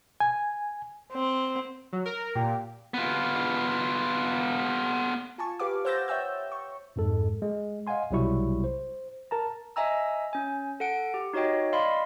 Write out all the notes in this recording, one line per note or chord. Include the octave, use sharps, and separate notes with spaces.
G#5
C4
F#3
A#4
A#2 G4
B3 F4
F4 G#5 A5 C#6
G4 B4 F5 D6
C5 F#5 E6 G6 A6 A#6
C#5 E5 G5 E6 G6
C#6
F2 G#2 G#3 A4
G#3
D#5 F5 F#5 G#5 C6
B1 C3 F#3 G3 E4 C#6
C5
A#4 A5 A#5
D#5 E5 G#5 A#5 E6
C#4 G#5
A4 F#5 D7
G4
D#4 F#4 C#5 D#5 G5
D5 D#5 F5 B5 C6